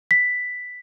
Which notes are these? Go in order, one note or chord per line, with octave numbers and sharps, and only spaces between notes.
B6